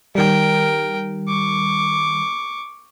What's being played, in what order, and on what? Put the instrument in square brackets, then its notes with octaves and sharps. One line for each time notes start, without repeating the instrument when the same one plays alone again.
[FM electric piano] D#3 G3 [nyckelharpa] A#4 G5
[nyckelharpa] C#6 D6